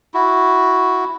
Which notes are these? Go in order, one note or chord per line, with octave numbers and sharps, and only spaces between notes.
E4 F#4